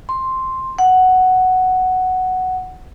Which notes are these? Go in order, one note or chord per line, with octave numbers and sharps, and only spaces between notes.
C6
F#5